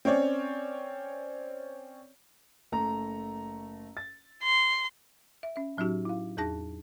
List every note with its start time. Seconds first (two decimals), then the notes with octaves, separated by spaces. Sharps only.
0.05 C4 C#4 C#5 D5
2.72 F#1 A3 A#5
3.97 A6
4.43 C6
5.43 E5
5.56 C#4 E5
5.77 A2 F#3 C#4 D#4 F#4 G4
6.05 E4 F5
6.37 E2 D#4 G#4 A5 A#6